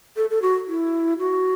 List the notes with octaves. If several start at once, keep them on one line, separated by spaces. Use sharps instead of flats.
A4
A4
F#4
E4
F#4